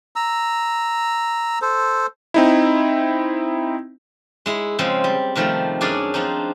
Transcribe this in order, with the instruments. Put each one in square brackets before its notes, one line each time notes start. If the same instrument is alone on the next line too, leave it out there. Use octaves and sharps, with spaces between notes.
[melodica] A#5 E6
A4 C5
[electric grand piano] C4 D#4 E4
[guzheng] G#3 E4 G#4
C#3 F3 G#3 C4
G3
C3 D#3 F3 G3 A3
F#2 C#4 D4 G#4 D5 G#5
F3 C4 D4 D#4